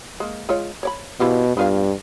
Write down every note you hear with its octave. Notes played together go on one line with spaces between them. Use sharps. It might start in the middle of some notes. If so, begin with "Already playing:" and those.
G#3 A#3
G#3 F4 C#5
C#5 D5 B5
B2 E4 F4 G4
G2 B3 F4 F5